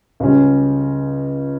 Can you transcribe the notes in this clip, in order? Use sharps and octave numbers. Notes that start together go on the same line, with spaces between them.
C#2 C#3 G3 C#4